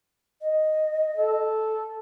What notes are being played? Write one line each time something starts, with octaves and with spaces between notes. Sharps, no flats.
D#5
A4